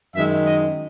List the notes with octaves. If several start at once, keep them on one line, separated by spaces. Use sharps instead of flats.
F#2 D#3 G#3 E5
D#5